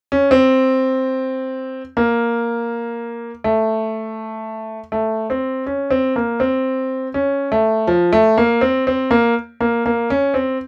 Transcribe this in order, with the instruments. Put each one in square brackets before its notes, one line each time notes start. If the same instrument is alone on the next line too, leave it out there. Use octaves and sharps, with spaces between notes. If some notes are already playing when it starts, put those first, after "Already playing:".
[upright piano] C#4
C4
A#3
A3
A3
C4
C#4
C4
A#3
C4
C#4
A3
F3
A3
A#3
C4
C4
A#3
A#3
A#3
C#4
C4